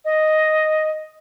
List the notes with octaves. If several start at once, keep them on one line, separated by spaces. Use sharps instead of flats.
D#5